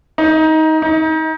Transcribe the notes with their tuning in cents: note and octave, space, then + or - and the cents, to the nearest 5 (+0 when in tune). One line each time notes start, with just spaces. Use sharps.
D#4 +20
D#4 +30